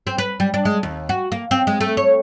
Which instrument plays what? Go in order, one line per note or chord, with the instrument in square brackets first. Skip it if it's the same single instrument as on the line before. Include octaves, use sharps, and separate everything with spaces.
[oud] C4
B4
G3
D4
G#3
D#2
F#4
A#3
C4
G#3
A3
C#5